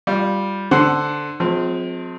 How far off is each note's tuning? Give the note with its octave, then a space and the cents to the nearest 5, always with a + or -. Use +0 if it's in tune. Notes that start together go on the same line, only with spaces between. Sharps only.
G3 +0 F4 +0
D3 +0 C5 +0 F#5 +10
F3 +35 G#3 +25 C4 -20